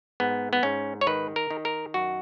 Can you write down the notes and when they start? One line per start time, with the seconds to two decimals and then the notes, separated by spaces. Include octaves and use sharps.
0.20 G#2 B3
0.53 B3
0.63 G#2 C#4
1.01 C#5
1.07 D#3 B4
1.36 A#4
1.51 D#3
1.65 A#4
1.94 F#2 F#4